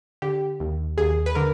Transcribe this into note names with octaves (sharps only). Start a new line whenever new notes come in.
D3 G4
D#2
D#2 G#4
B4
D3 A#4